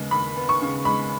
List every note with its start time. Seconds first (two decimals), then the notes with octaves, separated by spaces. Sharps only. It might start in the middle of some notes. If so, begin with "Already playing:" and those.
Already playing: D#2 C#3 G#3 B3
0.11 D#2 B5
0.36 B3
0.49 C#6
0.61 C#3
0.85 G#3 B5